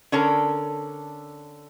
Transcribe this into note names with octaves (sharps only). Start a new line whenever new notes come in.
D3 C#4 A4 A#4